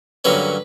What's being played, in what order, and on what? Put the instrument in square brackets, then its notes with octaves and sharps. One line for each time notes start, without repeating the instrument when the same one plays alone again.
[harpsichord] G2 D3 F#3 A#3 C#4 B4